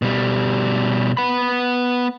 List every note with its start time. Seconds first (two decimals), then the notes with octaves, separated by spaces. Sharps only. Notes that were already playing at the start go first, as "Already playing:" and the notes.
0.02 B2 G3
1.17 B3 B5